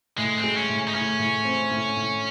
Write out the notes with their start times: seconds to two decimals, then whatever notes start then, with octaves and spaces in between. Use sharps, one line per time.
0.18 A2 G#3
0.38 C4
0.44 G#3
0.57 C#4
0.69 A2
0.88 D#4
0.94 A2 C#4
1.19 A2
1.45 C4
1.71 A2
1.96 A2